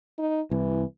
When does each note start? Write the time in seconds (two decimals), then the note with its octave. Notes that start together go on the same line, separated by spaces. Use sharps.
0.19 D#4
0.51 C2 E3